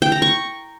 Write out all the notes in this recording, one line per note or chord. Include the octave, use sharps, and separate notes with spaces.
G5
A#5
C#6